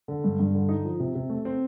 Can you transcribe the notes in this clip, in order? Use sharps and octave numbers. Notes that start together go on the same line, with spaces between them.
D3
G2
G2
D3
D#4
F3
C3
C3
A3
C4